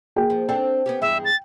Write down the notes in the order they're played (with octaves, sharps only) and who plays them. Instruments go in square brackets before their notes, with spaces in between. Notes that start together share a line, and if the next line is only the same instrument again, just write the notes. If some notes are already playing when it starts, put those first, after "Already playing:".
[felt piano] A#3 G#4 G5
[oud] F3
[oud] C4 D4 A4 [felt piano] G5
[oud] B3 C#4 G4
[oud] E2 G2 G#3 [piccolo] E5
[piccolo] A6